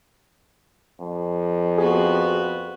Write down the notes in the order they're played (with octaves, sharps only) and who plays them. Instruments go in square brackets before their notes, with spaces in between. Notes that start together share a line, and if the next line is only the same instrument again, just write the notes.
[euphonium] F2
[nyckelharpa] B3 F#4 [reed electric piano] G#4